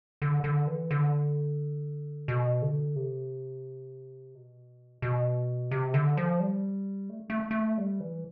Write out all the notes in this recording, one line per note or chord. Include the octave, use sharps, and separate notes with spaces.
D3
D3
E3
D3
B2
D3
C3
B2
B2
C3
D3
F3
G3
A3
A3
A3
G3
E3